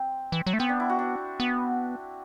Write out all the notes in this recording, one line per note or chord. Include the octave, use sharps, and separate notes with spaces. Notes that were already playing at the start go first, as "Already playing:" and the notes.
Already playing: C4
E3
F#3
A3
B3 C4
D4
E4
F#4
D4
B3